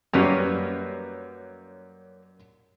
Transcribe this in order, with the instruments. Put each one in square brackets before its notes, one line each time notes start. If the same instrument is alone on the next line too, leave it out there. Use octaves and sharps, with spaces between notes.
[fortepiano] F#2 G3 [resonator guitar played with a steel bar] A#3 C#4 B4